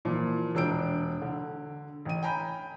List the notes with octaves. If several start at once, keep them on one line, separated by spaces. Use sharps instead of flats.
A#2 E3 F3
E1 D4 E6 G6 D7
D3
A1 D#7
G5 G#5 A#5 B5 G6